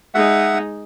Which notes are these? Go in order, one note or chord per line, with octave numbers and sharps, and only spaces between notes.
G#3 D#4 E5 F#5